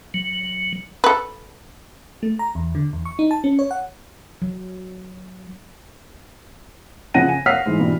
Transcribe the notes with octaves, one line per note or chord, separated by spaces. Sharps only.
F#3
A4 B4
A3
A#5
E2
D3
E2
C#6
D#4
A5
C#4
C#5
F#5
F#3
C#3 F3 F#5 A#6 D#7
G#5
C#5 F5 F#5 F6 B6 C7
G#2 E3
G2 B2 E3 G3